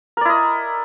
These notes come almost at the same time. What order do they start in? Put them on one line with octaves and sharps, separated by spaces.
A#4 D5 E4 D#5